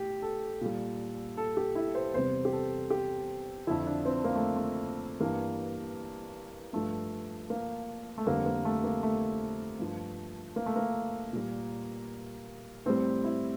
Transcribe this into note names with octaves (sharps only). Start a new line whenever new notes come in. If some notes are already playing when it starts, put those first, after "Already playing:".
Already playing: A2 G4
A4
A#2 G3
A4
G4
E4
C5
E2 C3 G3 C5
G4
A4
G4
F2 D3 F3 E4
D4
C4
A#3
A3
A3
G2 E3 G3 A#3
G2 F3 A3
A#3
A3
F2 D3 G3 A#3
A#3
A3
A#3
A3
G2 F3
A#3
A3
A#3
A#2 G3
A2 G3 C4
E4